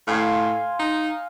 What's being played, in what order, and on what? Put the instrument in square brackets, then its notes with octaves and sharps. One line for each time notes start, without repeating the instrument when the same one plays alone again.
[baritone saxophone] A2 [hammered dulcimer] F5 G#5 C6
[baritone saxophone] D#4